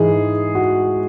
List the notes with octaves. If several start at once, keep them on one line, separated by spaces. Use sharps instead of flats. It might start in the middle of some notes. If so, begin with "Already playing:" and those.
Already playing: G#2 E3 G#3 G#4
F#4